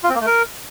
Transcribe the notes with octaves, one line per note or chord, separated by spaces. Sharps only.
F4
C4
A#3
A3
A#4